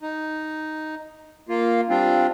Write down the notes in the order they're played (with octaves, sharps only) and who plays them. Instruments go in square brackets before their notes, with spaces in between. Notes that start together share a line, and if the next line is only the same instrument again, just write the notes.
[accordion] D#4
A#3 F4
G3 C4 D4 F4